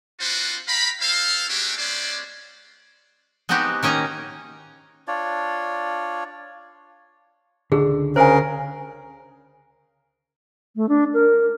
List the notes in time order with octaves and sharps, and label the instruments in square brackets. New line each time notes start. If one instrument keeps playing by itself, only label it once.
[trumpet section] C4 D4 F4 F#4 B4 C5
F5 G5 A#5 B5
E4 A4 C5 F5
G#3 A3 C#4 D4 F#4 G4
G#3 B3 C#4 C5 D5
[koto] G#3 B3 C4 D#4 F#4 G4
D#3 A#3 C#4 D#5 A#5
[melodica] D4 F4 C#5 D5
[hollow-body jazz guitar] C#2 D3 [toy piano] G#4
[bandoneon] C#3 A#4 [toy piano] C5 G#5
[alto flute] A3
D4
A#4